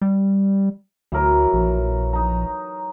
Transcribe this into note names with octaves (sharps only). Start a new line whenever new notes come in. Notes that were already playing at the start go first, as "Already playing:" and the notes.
G3
D2 E3 F#3 A#4
A#1
D#4 A#5